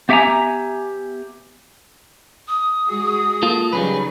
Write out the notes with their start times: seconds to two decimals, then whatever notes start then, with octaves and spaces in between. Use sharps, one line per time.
0.09 B3 G4 E5 F#5 G#5 A#5
2.48 D#6
2.89 G#3 F#4 G#4
3.43 A#3 F4 A4
3.73 C#3 F#3 G3 D#4 G#4 B4